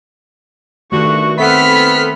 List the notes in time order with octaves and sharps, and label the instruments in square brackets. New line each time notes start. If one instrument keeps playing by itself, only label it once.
[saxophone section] G2 F#4 [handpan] D#3 A3 [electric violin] C#6
[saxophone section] B3 A4 [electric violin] C4 B5 [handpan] E5 F#5 [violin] F6 B6